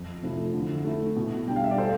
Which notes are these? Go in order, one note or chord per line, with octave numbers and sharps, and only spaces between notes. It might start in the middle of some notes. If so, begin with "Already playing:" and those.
Already playing: F2
C3 F3 A3 E4
D3
A3 E4
B2
G3 D4 G5
F5
E5
D5
A4 C5